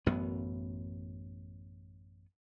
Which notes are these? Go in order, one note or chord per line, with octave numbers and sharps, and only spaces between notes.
A1 F#2 B3